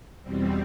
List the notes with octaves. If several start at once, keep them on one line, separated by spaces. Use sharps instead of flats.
E2 B2 G3 C4